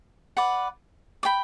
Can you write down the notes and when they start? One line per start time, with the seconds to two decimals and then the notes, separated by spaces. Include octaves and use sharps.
0.37 B4 D5 F#5
1.23 D5 G5 B5